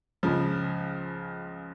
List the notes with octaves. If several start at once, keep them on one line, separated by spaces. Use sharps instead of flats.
C#2 C#3 F3